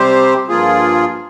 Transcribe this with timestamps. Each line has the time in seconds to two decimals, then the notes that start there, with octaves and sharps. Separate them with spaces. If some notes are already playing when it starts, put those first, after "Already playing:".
Already playing: C3 G3 C4 G4 C5
0.48 G2 F3 A#3 F4 G#4